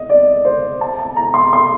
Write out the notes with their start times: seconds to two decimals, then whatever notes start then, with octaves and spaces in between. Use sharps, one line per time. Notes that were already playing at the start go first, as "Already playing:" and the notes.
Already playing: D#5
0.09 D5
0.45 C5
0.81 A5
0.99 A5
1.16 A#5
1.34 C6
1.53 C6